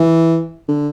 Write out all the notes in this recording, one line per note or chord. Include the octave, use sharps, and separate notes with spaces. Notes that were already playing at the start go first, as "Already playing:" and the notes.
Already playing: E3
D3